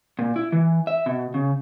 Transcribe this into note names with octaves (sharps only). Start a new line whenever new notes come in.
A#2
E4
E3
E5
B2
C#3